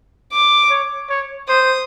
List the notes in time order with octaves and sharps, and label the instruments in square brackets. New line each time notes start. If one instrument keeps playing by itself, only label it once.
[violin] D6
[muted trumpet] C#5
C#5
[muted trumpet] C5 [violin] D#6